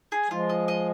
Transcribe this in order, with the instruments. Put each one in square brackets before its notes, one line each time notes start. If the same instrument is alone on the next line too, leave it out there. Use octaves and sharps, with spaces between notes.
[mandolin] G#4
[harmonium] F3 G#3 [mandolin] F4
[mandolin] D#5
D#5